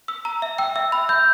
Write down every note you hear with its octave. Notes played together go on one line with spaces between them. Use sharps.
E6
A#5
E5
G5 E6
E5
B5
E5 G6